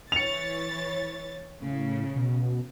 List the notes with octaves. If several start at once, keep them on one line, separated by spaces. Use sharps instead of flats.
E3 C#5 A6 C#7 F7
A2 C#3
B2